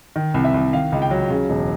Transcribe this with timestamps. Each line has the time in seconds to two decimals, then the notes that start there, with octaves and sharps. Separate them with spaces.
0.16 D#3
0.34 C2
0.44 E5
0.54 C2
0.73 D#3 F5
0.92 C#2
1.02 G5
1.11 F#3
1.30 C#3
1.50 E1